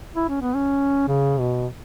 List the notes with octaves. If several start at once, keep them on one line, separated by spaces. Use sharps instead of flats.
E4
C#4
B3
C#4
C#3
B2